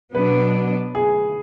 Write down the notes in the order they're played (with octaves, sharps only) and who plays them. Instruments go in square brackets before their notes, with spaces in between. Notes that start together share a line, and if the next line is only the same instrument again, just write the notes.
[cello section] B2 F#3 B3 D4 [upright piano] B4
[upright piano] G#4